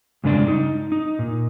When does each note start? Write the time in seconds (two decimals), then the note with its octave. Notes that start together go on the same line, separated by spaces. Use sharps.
0.24 G2 C#3 G#3 D4 G#4 D5
0.48 D#4
0.92 D#4
1.19 A#2